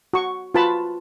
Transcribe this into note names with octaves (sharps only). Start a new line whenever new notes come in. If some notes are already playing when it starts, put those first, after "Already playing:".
F#4 C#6
F4 F#4 B4 A5 B5